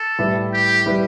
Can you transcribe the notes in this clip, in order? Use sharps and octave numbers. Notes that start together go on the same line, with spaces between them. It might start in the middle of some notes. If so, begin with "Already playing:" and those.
Already playing: A4
A2 G3 E4 B4
G4
G3 E4 B4